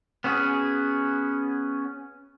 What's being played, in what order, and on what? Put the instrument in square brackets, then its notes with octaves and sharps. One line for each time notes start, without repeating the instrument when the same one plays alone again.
[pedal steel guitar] B3 C#4 F#4 G#4